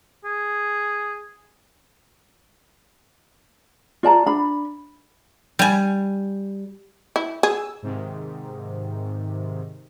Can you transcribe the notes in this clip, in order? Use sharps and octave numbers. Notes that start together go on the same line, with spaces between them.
G#4
F4 D5 A5 A#5
D4 B5
G3 G#5
E4
G#4 E6
G#2 C3 D#3